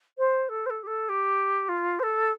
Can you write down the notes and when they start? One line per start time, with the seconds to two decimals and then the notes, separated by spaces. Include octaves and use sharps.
0.18 C5
0.49 A4
0.66 C5
0.70 A4
0.83 G4
0.87 A4
1.09 G4
1.69 F4
1.99 C5
2.03 A4